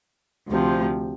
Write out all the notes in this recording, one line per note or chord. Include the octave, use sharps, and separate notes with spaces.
D2 C3 F3